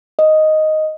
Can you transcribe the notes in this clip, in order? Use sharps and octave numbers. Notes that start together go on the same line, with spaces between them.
D#5